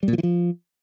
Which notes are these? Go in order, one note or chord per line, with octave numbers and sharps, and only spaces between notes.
G3
A#2
F3
E3
F3